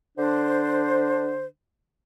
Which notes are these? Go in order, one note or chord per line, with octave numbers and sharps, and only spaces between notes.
D3 D4 C5